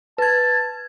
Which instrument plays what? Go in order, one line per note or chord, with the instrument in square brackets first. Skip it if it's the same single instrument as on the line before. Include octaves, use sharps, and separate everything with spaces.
[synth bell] B4 G#6 [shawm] A5